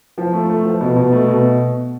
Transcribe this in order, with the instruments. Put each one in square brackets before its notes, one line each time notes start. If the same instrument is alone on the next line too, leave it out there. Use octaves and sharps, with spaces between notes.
[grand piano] F3
A3
A3
F3
B2
B2
A3
B2